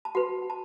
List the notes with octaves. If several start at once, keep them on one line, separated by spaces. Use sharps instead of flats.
A5
F#4 B4 F#5
A5